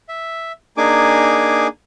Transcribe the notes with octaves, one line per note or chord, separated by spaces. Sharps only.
E5
A#3 D4 D#4 G#4 G#5 D6